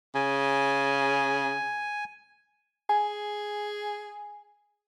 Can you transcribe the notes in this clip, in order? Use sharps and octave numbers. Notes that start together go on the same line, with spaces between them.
C#3 G#5
G#4 G#5